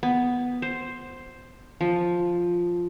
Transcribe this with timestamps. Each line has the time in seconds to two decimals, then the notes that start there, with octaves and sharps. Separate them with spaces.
0.03 B3
0.62 C5
1.81 F3